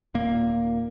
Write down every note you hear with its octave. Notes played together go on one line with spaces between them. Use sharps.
D#1 A#2 A#3